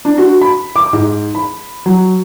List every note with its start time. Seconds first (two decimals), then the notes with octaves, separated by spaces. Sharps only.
0.05 D4
0.18 F#4
0.41 B5
0.76 D6
0.93 G#2
1.35 B5
1.86 F#3